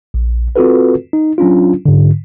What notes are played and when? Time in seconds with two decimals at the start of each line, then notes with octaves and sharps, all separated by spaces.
0.14 A#1
0.56 C4 F4 F#4 A4 B4
1.13 D#4
1.38 F#3 C#4 D4 F4
1.86 G#2 D3